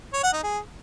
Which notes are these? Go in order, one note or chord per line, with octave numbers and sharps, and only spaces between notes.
C#5
F#5
D#4
G#4